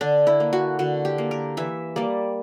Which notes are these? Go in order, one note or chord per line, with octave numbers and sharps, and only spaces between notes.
D3 D4
E4
A#3
F#4
D3 F#4
G4
A#3
A#4
E3 E5
G3 A#3 D5